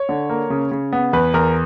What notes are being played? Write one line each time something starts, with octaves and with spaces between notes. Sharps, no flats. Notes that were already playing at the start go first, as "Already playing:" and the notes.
Already playing: C#5
D3
A#3
C#3
C#3
B3
E2 B4
E2 A#4